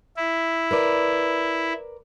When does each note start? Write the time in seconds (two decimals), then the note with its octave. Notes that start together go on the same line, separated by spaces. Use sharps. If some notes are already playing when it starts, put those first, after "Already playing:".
0.17 E4
0.71 A#4 B4 D5